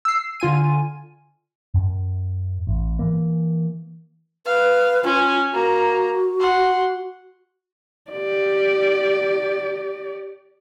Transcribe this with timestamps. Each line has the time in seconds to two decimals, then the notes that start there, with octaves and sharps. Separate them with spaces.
0.05 E6 C7
0.40 D3 F4 G#5 D#7
1.74 F#2
2.67 A1
2.99 E3 A#3
4.46 B4 F5
5.04 C#4 F4
5.53 A#3 F#4 A#5
6.40 F#5 C6
8.11 G4 D5